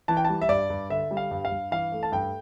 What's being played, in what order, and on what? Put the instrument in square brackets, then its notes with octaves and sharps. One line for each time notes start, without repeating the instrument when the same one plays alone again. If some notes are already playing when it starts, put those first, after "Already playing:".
[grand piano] E3 A5
G5
G3 A5
E5
G2 D5
G2
D3 E5
G3
F5
G2
F5
G2
E3 F5
A3
A5
G2 G5